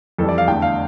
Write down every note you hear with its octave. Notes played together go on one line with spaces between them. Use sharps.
F2 E3 G3 A4
D5
F5
E2 D3 A3 G5
F5